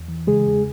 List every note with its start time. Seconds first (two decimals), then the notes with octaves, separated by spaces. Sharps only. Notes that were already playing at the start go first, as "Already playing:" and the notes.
Already playing: E2
0.08 E3
0.27 C#3 G#3 G#4
0.46 E2